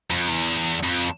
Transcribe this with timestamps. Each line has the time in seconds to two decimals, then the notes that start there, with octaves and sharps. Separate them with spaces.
0.10 F2
0.28 E2
0.83 F2